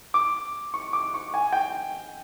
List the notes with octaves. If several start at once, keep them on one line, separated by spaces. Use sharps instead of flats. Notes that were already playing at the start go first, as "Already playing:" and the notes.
D6
C#6
D6
C#6
G#5
G5